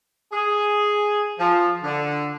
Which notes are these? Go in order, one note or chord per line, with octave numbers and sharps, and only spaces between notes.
G#4
F3
D3